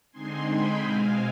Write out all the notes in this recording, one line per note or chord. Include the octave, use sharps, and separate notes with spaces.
D3 G#3 C4 D#4 G#5 C6
G5 B5
B2 G#3 C4 F5 G#5